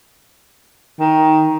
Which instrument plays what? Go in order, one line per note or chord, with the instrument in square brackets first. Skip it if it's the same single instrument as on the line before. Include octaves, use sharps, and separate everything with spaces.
[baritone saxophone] D#3